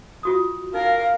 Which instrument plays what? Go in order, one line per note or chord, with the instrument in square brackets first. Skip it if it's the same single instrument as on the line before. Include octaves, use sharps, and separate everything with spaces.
[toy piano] F4 F#4 D#6
[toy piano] D#4 [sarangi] A#4 [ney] F5